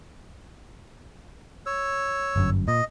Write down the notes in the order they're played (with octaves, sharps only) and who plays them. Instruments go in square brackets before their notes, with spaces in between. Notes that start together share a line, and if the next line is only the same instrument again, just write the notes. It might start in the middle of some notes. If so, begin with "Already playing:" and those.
[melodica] C#5 E6
[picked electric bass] G1 F#2
[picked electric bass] A#2 [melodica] D#5